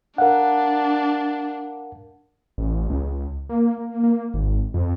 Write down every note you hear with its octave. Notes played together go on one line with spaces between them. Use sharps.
D4 A#4 F5 F#5
A1
C#2
A#3
A#3
A#3
G#1
F2